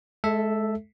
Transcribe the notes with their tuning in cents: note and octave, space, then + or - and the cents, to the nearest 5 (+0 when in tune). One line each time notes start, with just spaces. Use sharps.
G#3 +35 A4 +0 E5 +0